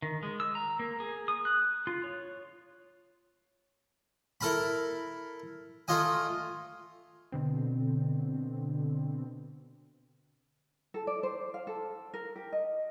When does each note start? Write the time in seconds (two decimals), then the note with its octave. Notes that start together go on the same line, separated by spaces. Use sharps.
0.02 D#3
0.23 G#3
0.40 E6
0.55 A#5
0.79 A#3
1.00 G#4
1.28 D#6
1.45 F#6
1.87 F4
2.04 C#5
4.41 E4 A4 A#4 A5 B5
5.88 A3 F4 D#5 G#5
7.32 B2 D3 C4
10.94 A4
11.07 D5
11.23 C5
11.54 F5
11.67 A4
12.14 A#4
12.36 G4
12.52 D#5